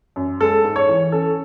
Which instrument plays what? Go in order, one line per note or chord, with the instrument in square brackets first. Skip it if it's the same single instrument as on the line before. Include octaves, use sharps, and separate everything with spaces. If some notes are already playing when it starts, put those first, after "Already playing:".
[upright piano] F#2
G#3 A4
G#2
C#5
E3
C#4 A4